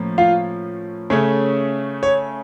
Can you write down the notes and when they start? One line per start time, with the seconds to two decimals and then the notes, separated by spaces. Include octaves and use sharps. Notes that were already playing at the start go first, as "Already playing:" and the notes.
Already playing: A2 F3 A#3 C#4
0.18 F4 F5
1.10 C#3 A3 C#4 C#5
2.03 C#5